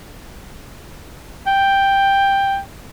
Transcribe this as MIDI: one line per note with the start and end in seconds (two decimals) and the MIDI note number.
1.46 2.58 79